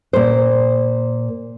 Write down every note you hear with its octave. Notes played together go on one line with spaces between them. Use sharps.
A#2 C5